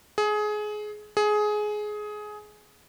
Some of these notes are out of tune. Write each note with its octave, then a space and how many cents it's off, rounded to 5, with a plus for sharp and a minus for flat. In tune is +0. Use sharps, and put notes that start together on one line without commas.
G#4 +20
G#4 +15